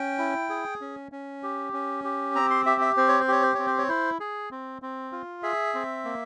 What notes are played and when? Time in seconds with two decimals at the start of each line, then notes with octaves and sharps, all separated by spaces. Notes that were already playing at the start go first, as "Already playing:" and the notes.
Already playing: C#4 G5
0.18 E4
0.50 G#4
0.81 C#4
1.12 C#4
1.43 G4
1.73 C#4
2.04 G4
2.35 C4 A#5
2.50 C6
2.66 G4 E5
2.81 E5
2.97 C4 C5
3.08 C#5
3.20 C5
3.28 G4 C#5
3.42 C5
3.55 C4 C#5
3.67 C5
3.78 C#5
3.89 E4 C5
4.20 G#4
4.51 C4
4.82 C4
5.12 F4
5.43 G#4 E5
5.74 C4
6.05 A#3